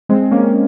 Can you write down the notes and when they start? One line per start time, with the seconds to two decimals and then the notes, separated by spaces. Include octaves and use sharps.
0.09 G#3 C4
0.31 A#3 C#4